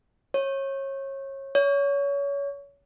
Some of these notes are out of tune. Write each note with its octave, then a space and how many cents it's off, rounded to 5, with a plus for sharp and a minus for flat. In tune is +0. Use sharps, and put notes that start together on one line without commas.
C#5 -30
C#5 +25